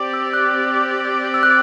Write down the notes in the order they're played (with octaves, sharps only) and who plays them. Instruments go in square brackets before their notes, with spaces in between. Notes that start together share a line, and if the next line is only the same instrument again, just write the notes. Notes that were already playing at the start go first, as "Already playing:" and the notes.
Already playing: [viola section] C4 G4 D5
[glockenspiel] E6
F#6
E6
F#6